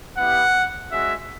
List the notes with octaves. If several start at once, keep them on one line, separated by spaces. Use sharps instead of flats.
B3 E4 G4 F#5
G#3 C#4 F#4 E5